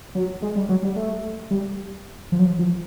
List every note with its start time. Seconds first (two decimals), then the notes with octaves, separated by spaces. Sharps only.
0.15 F#3
0.42 G#3
0.56 G3
0.69 F#3
0.83 G3
0.96 A3
1.51 G3
2.32 F3
2.39 F#3
2.46 F3
2.59 F3